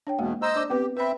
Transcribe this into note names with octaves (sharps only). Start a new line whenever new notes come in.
D4 C#5 G5
E2 B2 G#3 A#3 F#5
C5 D#5 A#5 C6 E6
D4 D5 D6
B3 C4 G4 B4
C4 B4 E5 B5